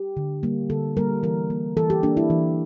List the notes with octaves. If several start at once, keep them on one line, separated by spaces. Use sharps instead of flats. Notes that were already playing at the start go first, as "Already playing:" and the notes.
Already playing: G4
D3
G3 A#3
D3 A4
G3 A#3 A#4
E3 A#4
A#3
E3 A4
G4
A#3 D4
E4
E3